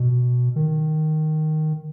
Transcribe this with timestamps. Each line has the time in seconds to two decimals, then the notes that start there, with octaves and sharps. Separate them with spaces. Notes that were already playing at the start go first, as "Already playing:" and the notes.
Already playing: B2
0.56 D#3